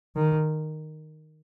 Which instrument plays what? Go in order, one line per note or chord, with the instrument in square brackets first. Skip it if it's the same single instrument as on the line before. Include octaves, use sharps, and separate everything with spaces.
[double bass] D#3